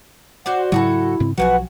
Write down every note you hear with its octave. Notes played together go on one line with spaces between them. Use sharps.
F#4 C5 D5 F#5
G#2 C#3 F#3 E4 F#4 G#4 A4
G#2 C#3 C4
B1 F3 F#3 F#4 B4 F#5 G#5